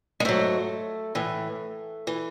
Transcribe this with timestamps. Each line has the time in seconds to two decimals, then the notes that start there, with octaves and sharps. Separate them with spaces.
0.20 G#3
0.25 G#2 F#3 A3
1.15 A2 E3
2.07 E3